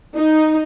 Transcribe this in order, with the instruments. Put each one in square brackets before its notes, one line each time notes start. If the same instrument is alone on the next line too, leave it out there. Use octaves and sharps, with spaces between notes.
[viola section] D#4